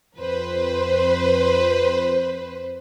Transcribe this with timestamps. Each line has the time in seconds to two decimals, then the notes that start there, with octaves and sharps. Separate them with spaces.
0.18 F2 B4 C5